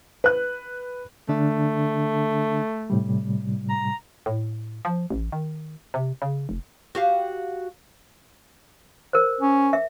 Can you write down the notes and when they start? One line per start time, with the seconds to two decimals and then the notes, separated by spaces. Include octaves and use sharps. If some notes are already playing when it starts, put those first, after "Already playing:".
0.24 B4 F#6
1.29 D3 A3 D4
2.90 A2 C3 G3
3.70 A#5
4.26 A2
4.85 F3
5.10 A1
5.32 D#3
5.94 C3
6.22 C#3
6.49 F1
6.95 F#4 G4 F5
9.13 A#4 C5
9.41 C#4
9.73 E5